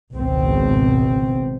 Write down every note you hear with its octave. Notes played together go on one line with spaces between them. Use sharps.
G#1 C#2 B2 C4